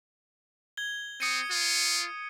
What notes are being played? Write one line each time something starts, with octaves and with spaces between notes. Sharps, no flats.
G#6 G7
C4 D#6 C#7 D#7
F4